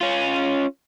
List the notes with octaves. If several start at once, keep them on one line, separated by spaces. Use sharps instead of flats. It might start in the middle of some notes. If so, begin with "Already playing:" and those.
C#4 F4